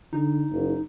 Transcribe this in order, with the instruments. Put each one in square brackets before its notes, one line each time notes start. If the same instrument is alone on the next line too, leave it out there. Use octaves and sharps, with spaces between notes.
[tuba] D3 [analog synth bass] D#4
[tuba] F#1